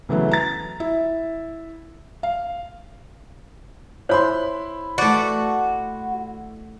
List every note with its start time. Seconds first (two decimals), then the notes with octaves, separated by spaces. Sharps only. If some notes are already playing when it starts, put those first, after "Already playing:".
0.09 C#3 E3 F#3 A3 B3
0.31 A#5 A6
0.80 E4
2.23 F5
4.09 E4 C5 C#5 B5 C6
4.98 A3 F#4 D5